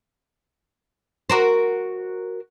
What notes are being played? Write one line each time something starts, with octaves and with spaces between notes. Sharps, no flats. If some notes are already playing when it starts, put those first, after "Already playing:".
F#4 A#4 C5